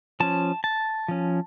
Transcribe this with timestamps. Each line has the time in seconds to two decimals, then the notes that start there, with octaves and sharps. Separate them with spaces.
0.20 F3 C#4 A5
0.64 A5
1.08 F3 C#4